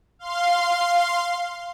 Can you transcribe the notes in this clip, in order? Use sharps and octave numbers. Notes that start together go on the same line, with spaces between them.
F5 C6